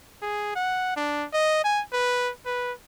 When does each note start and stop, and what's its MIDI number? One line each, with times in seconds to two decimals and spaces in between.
0.22 0.54 68
0.56 0.94 78
0.96 1.25 62
1.33 1.64 75
1.64 1.82 80
1.93 2.30 71
2.46 2.72 71